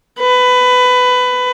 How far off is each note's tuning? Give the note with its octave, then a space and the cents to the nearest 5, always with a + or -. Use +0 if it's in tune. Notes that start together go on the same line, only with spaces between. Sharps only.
B4 +20